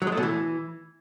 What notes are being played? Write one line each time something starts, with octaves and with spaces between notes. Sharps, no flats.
F#3
G#3
A3
B2
E3